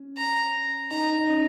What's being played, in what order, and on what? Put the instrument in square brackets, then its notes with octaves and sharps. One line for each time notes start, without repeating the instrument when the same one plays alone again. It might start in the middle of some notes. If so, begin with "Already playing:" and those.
Already playing: [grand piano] C#4
[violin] A#5
[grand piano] D#4 [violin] A#5
[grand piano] D#4
C#4